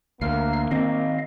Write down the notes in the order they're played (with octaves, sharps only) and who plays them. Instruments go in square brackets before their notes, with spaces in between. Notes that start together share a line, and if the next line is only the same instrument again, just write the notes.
[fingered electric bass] D2 [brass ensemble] A#3 [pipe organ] F5 F6
[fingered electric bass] D#3 C4 [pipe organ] D#5 F5